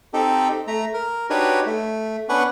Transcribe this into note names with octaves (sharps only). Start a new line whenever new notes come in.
C4 D#4 G4 A4
A3 A#5
A#4
D4 D#4 F#4 G4 B4 C#5
A3
B3 C#4 D4 B4 F#5 C#6